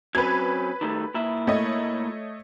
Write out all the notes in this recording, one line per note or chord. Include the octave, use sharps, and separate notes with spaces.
F#3 C4 C#4 B4 G#6
D#3 G3 A3
A#2 E4 E5
A3 C#5 D#5